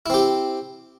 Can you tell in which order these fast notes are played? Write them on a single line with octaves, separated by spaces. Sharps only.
E4 C4 G4